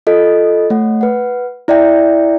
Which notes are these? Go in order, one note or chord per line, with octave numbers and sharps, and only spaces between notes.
F4 A4 D#5
A3 C#5 F#5
B4 F#5
E4 D5 E5 G5